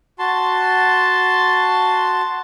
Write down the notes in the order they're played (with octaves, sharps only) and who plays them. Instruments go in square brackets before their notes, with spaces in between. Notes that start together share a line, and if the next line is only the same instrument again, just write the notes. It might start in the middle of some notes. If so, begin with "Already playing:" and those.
[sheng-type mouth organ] F#4 A5 C6